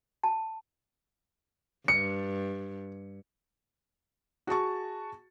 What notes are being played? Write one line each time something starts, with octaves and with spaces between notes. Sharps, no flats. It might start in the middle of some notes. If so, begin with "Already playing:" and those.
A5
G2 C#7
F#4 G#4 A5 C#6